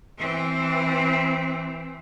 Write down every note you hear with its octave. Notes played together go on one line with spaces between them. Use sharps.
E3 C4